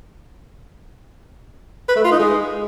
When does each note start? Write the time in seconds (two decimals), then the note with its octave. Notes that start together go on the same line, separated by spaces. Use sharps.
1.89 B4
1.96 A3
2.04 F4
2.12 D#4
2.19 G#3